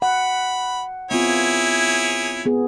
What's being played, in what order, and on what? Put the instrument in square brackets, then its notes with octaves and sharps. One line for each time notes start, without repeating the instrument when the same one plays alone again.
[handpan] F#5 [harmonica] B5
[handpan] B3 C4 F4 [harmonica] E4 G#4 C#5
[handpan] B3 G#4